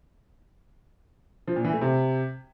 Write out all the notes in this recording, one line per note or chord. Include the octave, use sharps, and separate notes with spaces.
F3
A#2
E3
A3
C3